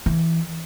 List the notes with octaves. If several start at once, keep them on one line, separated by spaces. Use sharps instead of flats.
E3